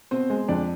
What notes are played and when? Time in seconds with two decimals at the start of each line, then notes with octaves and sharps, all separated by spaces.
0.11 B2 C4 C5
0.30 G#3
0.48 F2 D4 D5